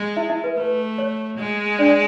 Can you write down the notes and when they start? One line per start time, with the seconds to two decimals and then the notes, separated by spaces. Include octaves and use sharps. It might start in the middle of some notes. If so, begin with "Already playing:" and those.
Already playing: G#3
0.17 E4 E5
0.30 E4 E5
0.44 B4
0.57 A3 B4
0.98 C#5
1.38 G#3
1.79 D4 D5